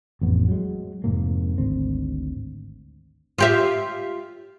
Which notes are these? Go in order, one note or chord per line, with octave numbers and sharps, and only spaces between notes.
A1 F2 B3
F#3 G#3
F1 G#2 C3 A#3
G#1 D2 C4
F4 G4 E5